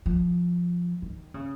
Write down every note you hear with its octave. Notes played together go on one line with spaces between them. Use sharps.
F3
D#3
C#3